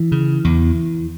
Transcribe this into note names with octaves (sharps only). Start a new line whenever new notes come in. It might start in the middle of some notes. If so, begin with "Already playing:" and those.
Already playing: E3
C#3
E2